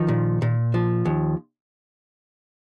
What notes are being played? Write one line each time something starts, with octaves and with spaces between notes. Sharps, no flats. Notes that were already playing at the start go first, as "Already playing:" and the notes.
Already playing: D#3 F3 D#4
A#2
A#2
F3
D#2